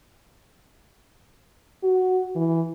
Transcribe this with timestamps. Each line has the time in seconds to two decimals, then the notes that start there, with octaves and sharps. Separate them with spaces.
1.83 F#4
2.36 E3